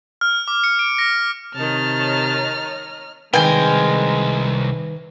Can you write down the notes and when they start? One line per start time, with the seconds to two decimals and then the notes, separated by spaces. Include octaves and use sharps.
0.21 F6
0.48 D6
0.64 C#7
0.79 D7
0.98 A#6
1.56 C3 D#3 C#5 D#5 A5 A#5 F6
3.34 C2 D#3 G#3 A#4 B4 G5 G#5